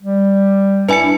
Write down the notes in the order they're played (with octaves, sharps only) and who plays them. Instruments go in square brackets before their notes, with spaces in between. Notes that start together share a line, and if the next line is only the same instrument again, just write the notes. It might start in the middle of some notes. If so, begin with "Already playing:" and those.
[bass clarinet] G3
[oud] D4 E4 [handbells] B4 G#5 C#7